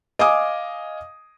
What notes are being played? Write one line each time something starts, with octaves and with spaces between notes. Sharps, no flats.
D#5 F5 G#5 D6 D#6